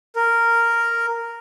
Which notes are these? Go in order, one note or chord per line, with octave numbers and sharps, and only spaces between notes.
A#4